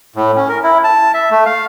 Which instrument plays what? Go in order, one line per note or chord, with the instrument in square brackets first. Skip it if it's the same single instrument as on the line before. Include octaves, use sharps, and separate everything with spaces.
[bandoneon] A2
C#4
A#4
E4
A5
E5
A3
F5